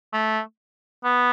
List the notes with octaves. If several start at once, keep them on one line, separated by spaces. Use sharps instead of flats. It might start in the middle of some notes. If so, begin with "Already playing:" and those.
A3
B3